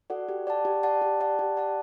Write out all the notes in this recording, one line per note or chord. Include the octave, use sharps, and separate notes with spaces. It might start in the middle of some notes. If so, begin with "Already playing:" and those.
F#4 A4 D5 F#5
G4
D5 F#5 A5
G4
D5 F#5 A5
G4
D5 F#5 A5
G4
D5 F#5 A5